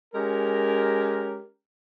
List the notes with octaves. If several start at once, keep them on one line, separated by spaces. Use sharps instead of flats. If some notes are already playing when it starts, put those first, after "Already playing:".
G#3 C#4 G4 A#4